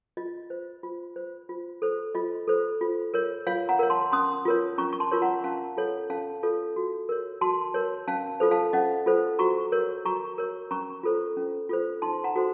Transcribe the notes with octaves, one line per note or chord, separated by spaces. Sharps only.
F4 D#5
C5
F4
C5
F4
A4 C5
F4 D#5
A4 C5
F4
A#4 C#5
F4 C#5 F5
F#5 A#5
A#4 C#5
A5 C6
C#4 C6 D#6
F4 A#4 C#5
C#4 A#5 C#6
C#6
A5 C6
F4 A#4 C#5
F#5 A#5
C#4 F5 A5
F4 A4 C#5
C#4 F5 A5
F4 A4 C#5
F#4
A#4 C#5
F#4 A5 C6
A#4 C#5
C#4 F5 A5
F4 A4 C5
F5 A5
C#4 D#5 F#5
F4 A4 C5
F#4 A#5 C#6
A#4 C#5
F#4 A#5 C#6
A#4 C#5
C#4 A#5 C#6
F4 A4 C5
C#4
F4 A4 C5
D#4 A5 C6
F#5 A#5
F#4 A4 C5